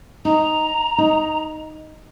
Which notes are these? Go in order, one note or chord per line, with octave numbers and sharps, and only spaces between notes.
D#4 A#5
D#4